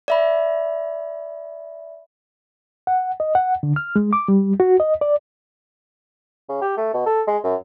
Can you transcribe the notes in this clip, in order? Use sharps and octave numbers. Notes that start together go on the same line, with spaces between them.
D5 E5 B5
F#5
D#5
F#5
D3
F6
G#3
D6
G3
F#4
D#5
D5
C#3
G4
A3
B2
A4
G#3
F#2